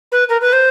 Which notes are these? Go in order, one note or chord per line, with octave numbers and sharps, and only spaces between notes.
B4
A#4
B4
C5